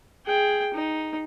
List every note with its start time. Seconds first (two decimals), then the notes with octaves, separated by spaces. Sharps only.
0.26 G#4 G5
0.74 D#4